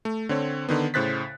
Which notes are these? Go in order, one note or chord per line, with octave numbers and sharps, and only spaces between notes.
A3
D3 C4 C#5
D3 D#3 B3
A2 C#3 C5 F#6 A6 B6